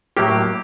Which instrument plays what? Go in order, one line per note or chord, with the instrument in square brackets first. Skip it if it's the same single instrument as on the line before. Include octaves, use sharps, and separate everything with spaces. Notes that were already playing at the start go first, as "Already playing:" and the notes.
[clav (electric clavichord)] A2 F#3 A#3 [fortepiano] G4